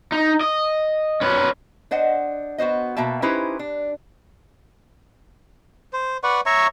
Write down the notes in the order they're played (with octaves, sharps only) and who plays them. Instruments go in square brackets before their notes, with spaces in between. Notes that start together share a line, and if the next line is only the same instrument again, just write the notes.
[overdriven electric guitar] D#4
D#5
C#4 B4
[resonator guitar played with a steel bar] D4 C5 D#5 F#5
B3 F#4 C5 D#5
B2 A#3 E5 G5 A5
C#4 D#4 E4 G4 B4 C5
D4
[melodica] C5
B4 D5 F#5 C#6
C#5 E5 A#5 C#6